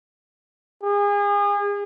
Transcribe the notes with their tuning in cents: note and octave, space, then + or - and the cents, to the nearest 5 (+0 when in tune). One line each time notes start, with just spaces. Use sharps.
G#4 -35